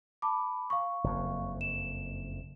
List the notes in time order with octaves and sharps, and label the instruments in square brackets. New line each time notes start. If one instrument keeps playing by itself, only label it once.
[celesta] A5 B5 D6
F5 C#6
[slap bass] F#1 F2 A#3
[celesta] E7